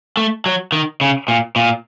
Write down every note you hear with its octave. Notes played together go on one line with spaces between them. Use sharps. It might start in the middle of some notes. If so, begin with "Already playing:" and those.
A3
F#3
D#3
C#3
A#2
A#2